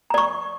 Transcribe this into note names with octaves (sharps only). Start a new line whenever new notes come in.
D5 A#5 C#6